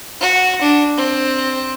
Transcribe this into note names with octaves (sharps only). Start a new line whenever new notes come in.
F#4
D4
C4